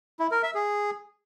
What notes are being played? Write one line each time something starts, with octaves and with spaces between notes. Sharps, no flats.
E4
A#4
E5
G#4